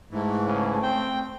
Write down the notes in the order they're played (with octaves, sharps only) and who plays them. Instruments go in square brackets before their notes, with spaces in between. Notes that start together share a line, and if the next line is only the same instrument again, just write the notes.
[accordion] G#2 E3 [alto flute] A3
[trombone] C#3
[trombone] C4 [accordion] G5